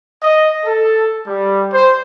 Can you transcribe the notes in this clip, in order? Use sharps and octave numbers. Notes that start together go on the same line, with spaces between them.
D#5
A4
G3
C5